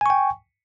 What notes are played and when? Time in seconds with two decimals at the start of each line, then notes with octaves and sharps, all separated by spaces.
0.01 G#5
0.06 C#6
0.10 G5